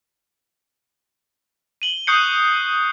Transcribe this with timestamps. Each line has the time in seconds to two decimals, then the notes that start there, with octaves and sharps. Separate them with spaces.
1.82 D#7 F#7 G7
2.07 C#6 D#6 F#6 G6 C7 C#7